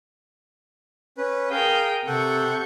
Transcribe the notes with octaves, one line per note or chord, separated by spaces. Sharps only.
C#4 B4
G#4 A#4 F5 G5 D#6
C3 A4 F#5 C#6 G6